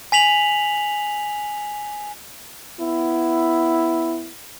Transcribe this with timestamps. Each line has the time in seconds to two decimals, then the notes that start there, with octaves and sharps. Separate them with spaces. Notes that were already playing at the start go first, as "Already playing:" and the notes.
0.12 G#5 B6 F7 F#7
2.79 B3 E4